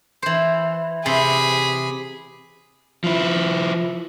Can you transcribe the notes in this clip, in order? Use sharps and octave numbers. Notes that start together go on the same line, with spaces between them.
E3 C5
C3 G#4 B5
F3 E4